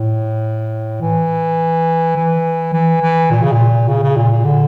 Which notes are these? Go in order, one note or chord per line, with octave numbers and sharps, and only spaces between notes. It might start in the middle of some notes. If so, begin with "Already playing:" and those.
Already playing: A2
E3
E3
E3
E3
A#2
C#3
A#2
C#3
C#3
A#2
A#2
D3